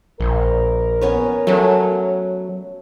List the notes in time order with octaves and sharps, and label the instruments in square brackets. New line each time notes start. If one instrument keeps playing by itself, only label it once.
[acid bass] A#1 [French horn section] A#4
[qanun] B3 C#4 C#5
[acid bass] F#3 [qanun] A3 C#4